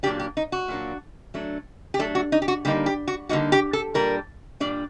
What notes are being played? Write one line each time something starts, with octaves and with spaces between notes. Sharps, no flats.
A#2 F#3 A#3 D4 G4
G4
D#4
F#4
A#2 F#3 A#3 D4
F#3 A3 D4
G4
F#3 A3 D4 A4
F#4
D#4
G4
F#4
D3 G3 A#3 D#4 G4
G4
F#4
D3 G3 A#3 D#4 F#4
G4
A4
A#2 G3 D4 A#4
A#2 G3 D4 D5